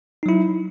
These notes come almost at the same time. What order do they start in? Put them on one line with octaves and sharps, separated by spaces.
D#4 F#3 E4